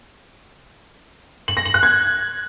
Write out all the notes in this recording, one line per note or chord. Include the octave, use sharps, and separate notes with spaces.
F#7
A#6
F#7
F#6
G#6